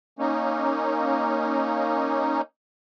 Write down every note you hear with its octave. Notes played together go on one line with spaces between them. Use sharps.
A#3 C#4 D#4